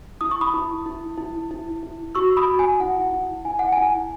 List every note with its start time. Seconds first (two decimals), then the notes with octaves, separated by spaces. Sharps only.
0.21 E4 D#6
0.31 C#6
0.41 B5 D#6
0.54 E4
0.86 E4
1.17 E4
1.51 E4
1.83 E4
2.15 F#4 C#6 E6
2.37 B5 D#6
2.48 F#4
2.59 G#5
2.80 E4 F#5
3.12 E4
3.45 E4 G#5
3.59 F#5
3.72 G#5
3.77 E4